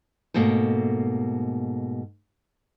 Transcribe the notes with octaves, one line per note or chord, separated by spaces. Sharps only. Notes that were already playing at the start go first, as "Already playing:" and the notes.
G#2 B2 A3 A#3